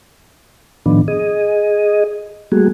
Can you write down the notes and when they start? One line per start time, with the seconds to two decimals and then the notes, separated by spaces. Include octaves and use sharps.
0.86 A2 D#3 F3 B3 D4
1.08 G#4 D#5
2.52 G3 A3 A#3 F#4 G#4